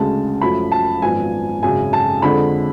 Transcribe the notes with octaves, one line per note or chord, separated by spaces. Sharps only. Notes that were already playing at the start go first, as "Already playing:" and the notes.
Already playing: D2 C#3 G#3 A5
F#2 F3 A3 B5
A5
G#1 F#2 F3 B3 G#5
G#1 F#2 C#3 G#5
A5
F2 D3 G#3 B5